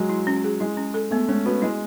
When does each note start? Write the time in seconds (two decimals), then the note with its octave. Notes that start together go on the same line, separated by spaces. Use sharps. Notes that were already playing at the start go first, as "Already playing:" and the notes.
Already playing: F#3 G#3
0.09 E4
0.27 C#4
0.44 G#4
0.60 G#3 E4
0.77 C#4
0.94 A4
1.11 A3 B3
1.28 G#3 C#4
1.46 B3 F#4
1.62 G#3 E4